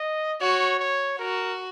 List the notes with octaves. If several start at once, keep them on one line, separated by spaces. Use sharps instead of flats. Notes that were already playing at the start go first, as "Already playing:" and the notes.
Already playing: D#5
F#4 C#5
C#5
F#4 A#4